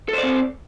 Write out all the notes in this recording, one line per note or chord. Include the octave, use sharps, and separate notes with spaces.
C4 A4 C5 D5